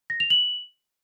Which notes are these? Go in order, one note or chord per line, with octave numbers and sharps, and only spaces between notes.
A#6
F7
F#7